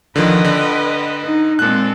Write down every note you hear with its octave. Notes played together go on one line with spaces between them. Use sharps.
D3 D#3 F3 B4 D#5 G5
D3
D#4
A#2 G#3 C4 A4 F#6